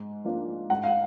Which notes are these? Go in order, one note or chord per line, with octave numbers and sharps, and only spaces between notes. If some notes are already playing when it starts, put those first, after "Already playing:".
Already playing: G#2
F3 A#3 D4 F4
G#2 F#5
F5